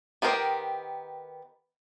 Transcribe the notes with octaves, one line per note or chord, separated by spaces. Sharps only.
D#3 B3 G4 A#4 C5